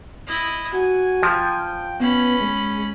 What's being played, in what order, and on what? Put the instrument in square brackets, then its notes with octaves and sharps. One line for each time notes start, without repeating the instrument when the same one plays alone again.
[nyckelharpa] E4 D#5
[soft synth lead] F#4 [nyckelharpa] G#5
[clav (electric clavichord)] F3 [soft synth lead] G5
[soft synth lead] B3 [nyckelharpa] C#4 B5
[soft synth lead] G#3